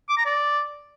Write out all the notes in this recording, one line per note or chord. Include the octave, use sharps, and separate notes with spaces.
D6
A#5
D5